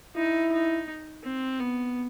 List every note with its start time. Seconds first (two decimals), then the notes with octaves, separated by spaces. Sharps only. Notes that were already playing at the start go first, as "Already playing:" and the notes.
0.16 D#4 E4
0.52 D#4
1.24 C4
1.60 B3